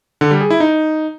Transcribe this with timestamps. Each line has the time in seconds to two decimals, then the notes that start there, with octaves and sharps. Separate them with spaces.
0.21 D3
0.31 G3
0.41 G#4
0.50 E4
0.60 D#4